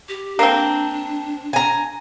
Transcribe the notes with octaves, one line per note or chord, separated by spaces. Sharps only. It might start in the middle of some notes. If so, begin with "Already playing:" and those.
G4
A#3 C4 D4
G#5 A#5